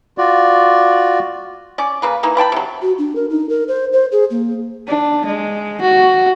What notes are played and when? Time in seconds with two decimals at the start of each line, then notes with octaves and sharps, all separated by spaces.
0.18 F4 F#4 D5
1.78 C#4 D5
2.02 C#3 A#3 B4
2.23 E3 A#3 D#4
2.37 B4 G5 A5 B5
2.52 C3 F#3
2.82 F#4
2.98 D4
3.16 A#4
3.30 D#4
3.49 A#4
3.68 C5
3.93 C5
4.12 G#4
4.30 A#3
4.88 D4
5.25 G#3
5.81 F#4